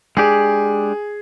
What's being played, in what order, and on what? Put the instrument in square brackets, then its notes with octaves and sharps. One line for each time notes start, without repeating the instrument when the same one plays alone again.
[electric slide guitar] G#3 D4 G4 D5 [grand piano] G#4